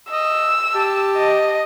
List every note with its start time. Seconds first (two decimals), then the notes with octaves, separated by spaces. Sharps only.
0.12 D#5 E6
0.75 G4 A5
1.17 D#5